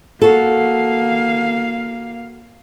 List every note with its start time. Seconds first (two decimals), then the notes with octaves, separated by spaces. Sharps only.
0.21 A#3 F#4 A4 F5